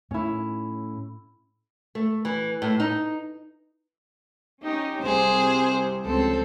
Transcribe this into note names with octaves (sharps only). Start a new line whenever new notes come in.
A2 C#4 E4
A3
E3
A2
D#4
C#4 D#4 G4
C2 C3 G#4 C5
C#2 F3 C4 A4